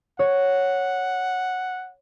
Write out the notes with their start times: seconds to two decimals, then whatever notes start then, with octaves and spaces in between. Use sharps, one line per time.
0.19 C#5 F#5